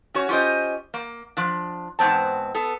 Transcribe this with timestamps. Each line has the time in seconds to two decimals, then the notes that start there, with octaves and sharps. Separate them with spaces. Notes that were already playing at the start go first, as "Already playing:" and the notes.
0.14 C#4 F#4 C#5
0.29 C#4 F4 G4 C5 D#5
0.94 A#3
1.37 F3 D4
1.99 E2 G#2 B3 C4 A5
2.55 B3 A4